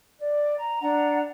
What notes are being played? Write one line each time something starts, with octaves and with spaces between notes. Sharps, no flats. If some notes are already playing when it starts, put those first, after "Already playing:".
D5
A#5
D4 F#5 A#5